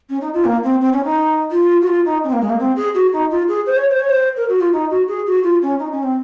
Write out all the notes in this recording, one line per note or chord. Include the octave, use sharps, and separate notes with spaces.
C#4
D#4
F4
A#3
C4
C4
C#4
D#4
F4
F#4
F4
D#4
C#4
C4
A#3
G#3
A#3
C4
G#4
F#4
D#4
F4
G#4
C5
C#5
C5
C#5
C5
A#4
F#4
F4
D#4
F#4
G#4
F#4
F4
C#4
D#4
C#4
C4